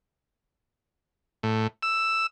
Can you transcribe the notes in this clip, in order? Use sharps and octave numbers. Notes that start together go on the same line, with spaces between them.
A2
E6